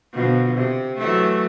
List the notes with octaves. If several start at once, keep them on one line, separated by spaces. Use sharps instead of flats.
B2 D3 F3
C3
E3 F#3 A3